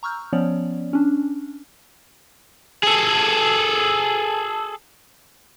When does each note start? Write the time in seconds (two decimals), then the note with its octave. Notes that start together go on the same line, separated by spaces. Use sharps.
0.03 A#5 C#6 E6 F6 G6
0.33 F3 B3 C#4 C#5 D5
0.93 C#4 D4
2.83 G#4 A4